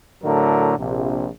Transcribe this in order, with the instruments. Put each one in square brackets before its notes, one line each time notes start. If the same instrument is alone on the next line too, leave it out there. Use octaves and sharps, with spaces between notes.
[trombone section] A2 D3 F#3 A3 A#4
A#1 C3